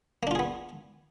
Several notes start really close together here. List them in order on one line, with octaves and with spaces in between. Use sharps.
A#3 D4 F4 G#4 B3